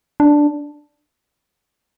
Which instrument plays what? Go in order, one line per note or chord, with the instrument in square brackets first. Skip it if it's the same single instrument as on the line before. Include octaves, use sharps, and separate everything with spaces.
[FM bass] D4